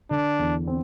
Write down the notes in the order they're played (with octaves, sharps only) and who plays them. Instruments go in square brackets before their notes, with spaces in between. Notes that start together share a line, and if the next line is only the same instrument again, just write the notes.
[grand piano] D3 [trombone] D4
[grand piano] E2
C4